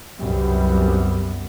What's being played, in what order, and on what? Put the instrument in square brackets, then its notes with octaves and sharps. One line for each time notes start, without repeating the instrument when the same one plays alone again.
[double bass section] C2 F#2 G3 B3